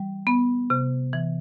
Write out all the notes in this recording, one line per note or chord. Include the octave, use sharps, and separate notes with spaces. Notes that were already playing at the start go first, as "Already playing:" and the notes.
Already playing: E3 G3
B3
C3
E3